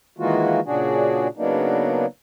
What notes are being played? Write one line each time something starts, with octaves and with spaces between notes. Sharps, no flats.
D#3 E3 G#3 A#3 F4 F#4
A#2 C#3 D4 F#4 G#4
C#3 F#3 A#3 B3 D4 D#4